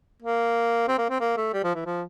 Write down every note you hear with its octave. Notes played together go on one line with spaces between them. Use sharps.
A#3
C4
A#3
C4
A#3
A3
G3
F3
E3
F3